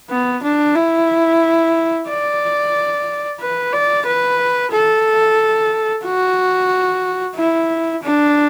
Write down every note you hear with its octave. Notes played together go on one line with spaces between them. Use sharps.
B3
D4
E4
D5
B4
D5
B4
A4
F#4
E4
D4